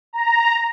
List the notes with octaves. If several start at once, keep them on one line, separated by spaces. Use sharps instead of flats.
A#5